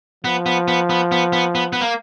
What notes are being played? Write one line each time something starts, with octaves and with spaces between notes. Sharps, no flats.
F3 B3
B3
B3
B3
B3
B3
B3
B3
A#3